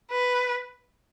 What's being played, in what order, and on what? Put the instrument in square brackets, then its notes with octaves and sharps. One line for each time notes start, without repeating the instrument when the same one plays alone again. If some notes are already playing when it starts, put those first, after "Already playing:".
[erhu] B4